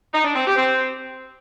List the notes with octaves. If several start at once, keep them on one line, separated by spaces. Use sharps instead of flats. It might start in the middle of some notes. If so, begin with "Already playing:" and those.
D#4
D4
C4
G4
C4